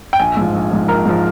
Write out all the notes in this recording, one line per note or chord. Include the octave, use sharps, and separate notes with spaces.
G5
A#1 G#5
G#2 F3
A#1
G#2 F3
A#1 A#4
G#2 F3